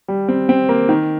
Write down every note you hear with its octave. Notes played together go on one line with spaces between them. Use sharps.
G3
C4
C4
A#3
D#3